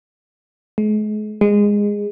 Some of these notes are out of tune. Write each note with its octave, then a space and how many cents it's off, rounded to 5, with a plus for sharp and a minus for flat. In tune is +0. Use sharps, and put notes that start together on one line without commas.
G#3 +40
G#3 -15